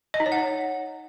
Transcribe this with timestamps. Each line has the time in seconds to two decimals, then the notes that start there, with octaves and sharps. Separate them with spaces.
0.14 D#5
0.20 D#4
0.26 C#5
0.32 F#5